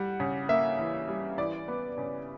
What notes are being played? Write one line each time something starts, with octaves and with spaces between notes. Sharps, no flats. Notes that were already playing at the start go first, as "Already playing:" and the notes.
Already playing: G3 F#5
C#3
A#3 E5
E3
G3
E3 D5
B3
C#3